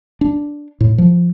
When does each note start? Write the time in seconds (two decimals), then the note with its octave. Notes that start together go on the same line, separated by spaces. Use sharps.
0.21 D4
0.81 A2
0.98 F3